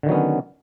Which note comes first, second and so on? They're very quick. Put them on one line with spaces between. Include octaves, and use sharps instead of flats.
D3 D#3 F#3 B3 C#4